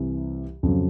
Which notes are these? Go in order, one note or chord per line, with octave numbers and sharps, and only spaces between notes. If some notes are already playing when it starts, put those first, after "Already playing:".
Already playing: C2 C3 E3
F2 C#3 F#3